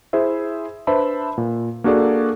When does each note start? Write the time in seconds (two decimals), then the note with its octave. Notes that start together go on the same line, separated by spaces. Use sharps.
0.13 E4 G#4 C5 E5
0.87 D4 B4 C5 E5 A5 B5
1.38 A#2
1.84 A#3 D4 F#4 G#4 A4 D5